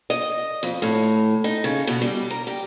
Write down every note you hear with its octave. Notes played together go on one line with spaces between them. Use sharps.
D#5
F2
A2
D#4
C#3
B2
G3
A#4
G4